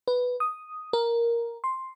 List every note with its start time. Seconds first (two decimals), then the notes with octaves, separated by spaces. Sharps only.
0.08 B4
0.40 D#6
0.93 A#4
1.64 C6